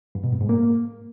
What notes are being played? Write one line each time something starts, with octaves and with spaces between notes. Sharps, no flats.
G2
B2
G2
G#2
A#3